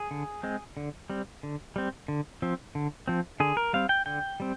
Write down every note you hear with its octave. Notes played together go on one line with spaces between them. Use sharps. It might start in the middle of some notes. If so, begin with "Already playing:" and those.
Already playing: G#4
D3
G#3 C4
D3
G3 C4
D3
G3 C4
D3
F3 C4
D3
F3 C4
D3 G#4
A#4
G3 C4 F5
G5
D3 G5
G3 C4